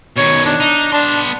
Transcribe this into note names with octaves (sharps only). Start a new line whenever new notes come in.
B2 D#3 C#5
D4
D#4
B3 D4 C6